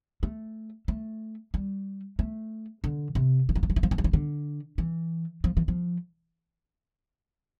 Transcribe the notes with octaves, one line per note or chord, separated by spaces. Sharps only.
A3
A3
G3
A3
D3
C3
E3
F3
E3
F3
E3
F3
E3
F3
E3
D3
E3
F3
E3
F3